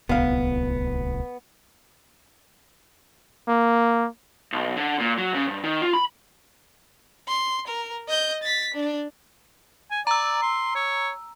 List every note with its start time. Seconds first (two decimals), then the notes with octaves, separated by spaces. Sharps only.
0.09 D1 C2 B3 F5
3.48 A#3
4.52 B1
4.77 D3
4.99 A#2
5.18 F#3
5.34 C#3
5.48 G2
5.64 D#3
5.82 F4
5.93 B5
7.28 C6
7.67 A#4
8.08 D#5 G6
8.43 A6 B6
8.74 D4
9.91 G#5
10.07 D5 A#5 E6
10.42 C6
10.76 C#5